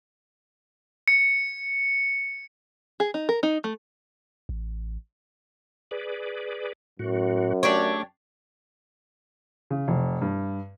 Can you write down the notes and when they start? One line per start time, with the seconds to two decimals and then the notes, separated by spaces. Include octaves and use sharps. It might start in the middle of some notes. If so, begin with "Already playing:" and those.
1.08 C#7
3.00 G#4
3.14 D#4
3.29 A#4
3.43 D#4
3.64 A3
4.49 A1
5.91 G#4 B4 D5
6.99 F#2 A2 F#4
7.63 A3 D4 G4 C#5
9.70 C#3
9.88 F1
10.22 G2